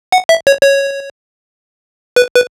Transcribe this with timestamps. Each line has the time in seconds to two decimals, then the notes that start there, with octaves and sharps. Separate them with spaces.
0.12 F#5
0.29 E5
0.47 C#5
0.63 C#5
2.16 B4
2.35 B4